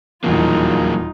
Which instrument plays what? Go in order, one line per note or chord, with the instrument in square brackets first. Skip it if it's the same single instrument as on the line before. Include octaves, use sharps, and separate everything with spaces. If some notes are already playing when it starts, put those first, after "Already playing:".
[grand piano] D#1 E2 B2 [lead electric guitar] F#3 A#3 [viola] D#4 F4